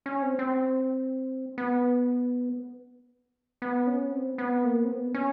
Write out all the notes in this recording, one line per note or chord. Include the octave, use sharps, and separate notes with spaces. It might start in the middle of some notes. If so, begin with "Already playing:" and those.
C#4
C4
C4
B3
B3
C#4
C4
B3
A#3
C4
B3
C#4